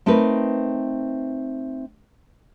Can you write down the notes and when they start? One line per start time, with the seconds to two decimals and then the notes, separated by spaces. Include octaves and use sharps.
0.06 A3 C4 D#4 A#4 B4